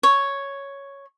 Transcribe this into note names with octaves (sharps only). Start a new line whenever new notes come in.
C#5